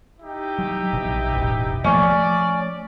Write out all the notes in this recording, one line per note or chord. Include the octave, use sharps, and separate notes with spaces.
D#4 E4 G4
F#3
A#1 B2
E1 A1 B2
F3 A3 C#4 D5